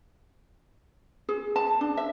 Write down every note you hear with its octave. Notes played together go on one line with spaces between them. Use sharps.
G#4
A5
D4
E5